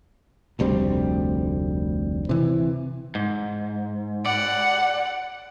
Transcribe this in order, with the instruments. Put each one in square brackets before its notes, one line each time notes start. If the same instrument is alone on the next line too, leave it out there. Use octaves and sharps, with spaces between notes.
[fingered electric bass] F1 D2 G3 C4
C3 E3
[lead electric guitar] G#2
[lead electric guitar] D5 [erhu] F#5